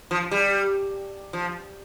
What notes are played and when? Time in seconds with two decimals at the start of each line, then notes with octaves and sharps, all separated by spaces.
0.11 F3
0.31 G3
1.33 F3